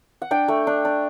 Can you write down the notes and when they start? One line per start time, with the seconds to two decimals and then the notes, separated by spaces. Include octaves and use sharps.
0.22 F#5
0.31 D4 G5
0.48 A3
0.67 D4
0.85 D4